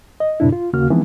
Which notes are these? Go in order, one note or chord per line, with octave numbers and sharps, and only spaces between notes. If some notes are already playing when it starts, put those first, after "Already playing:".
D#5
F#2 A2 C3 D4 E4
F4
D#2 C#3 A#3 F#4 F6
E3 F3 G#3 B3 C4 D#4